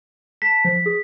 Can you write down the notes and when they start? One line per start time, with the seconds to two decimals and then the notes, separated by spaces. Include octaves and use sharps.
0.42 A5 B6
0.65 F3
0.86 G#4